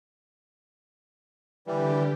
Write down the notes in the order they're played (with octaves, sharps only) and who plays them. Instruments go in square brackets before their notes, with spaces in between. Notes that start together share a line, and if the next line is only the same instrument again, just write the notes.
[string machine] D3 G4 [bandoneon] E3 G3